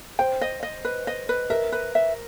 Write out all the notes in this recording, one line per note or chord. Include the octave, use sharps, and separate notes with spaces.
C5 G5
D#5
D#5
B4
D#5
B4
A#4 E5
B4
E5